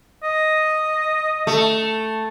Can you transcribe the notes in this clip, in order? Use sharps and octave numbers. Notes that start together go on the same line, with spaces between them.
D#5
A3